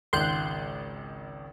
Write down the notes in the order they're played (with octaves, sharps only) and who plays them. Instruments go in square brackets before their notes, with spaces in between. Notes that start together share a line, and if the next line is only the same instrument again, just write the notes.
[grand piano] G#1 C#2 D#3 [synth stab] C6 F#6 G6